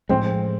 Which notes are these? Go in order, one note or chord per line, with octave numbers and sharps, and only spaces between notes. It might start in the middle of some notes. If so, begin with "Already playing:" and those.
A2 F3 G#3 C4